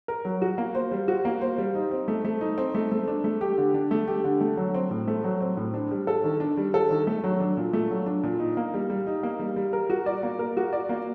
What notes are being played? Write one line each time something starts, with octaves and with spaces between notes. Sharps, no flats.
A#4
F#3
F#4
A#3
C5
G3
F#4
A#3
C5
G3
D#4
C4
A3
A3
D#4
C4
A3
A3
D4
A3
G4
D3
D4
A3
G4
D3
A3
F#3
C4
A2
A3
F#3
C4
A2
D4
G3
A4
D#3
D4
G3
A4
D#3
A3
F#3
D4
A#2
A3
F#3
D4
A#2
D#4
A#3
G3
G3
D#4
A#3
G3
G3
A#4
F#4
D5
A#3
A#4
F#4
D5
A#3